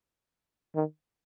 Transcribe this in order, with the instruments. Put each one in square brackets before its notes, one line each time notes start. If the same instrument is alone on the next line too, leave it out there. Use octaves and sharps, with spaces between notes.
[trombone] D#3